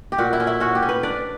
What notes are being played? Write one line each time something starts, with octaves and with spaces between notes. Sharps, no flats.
G4
A#2 F#4
E4
C#4
E4
C#4 F#4
G4
C#4
B4
D4 D5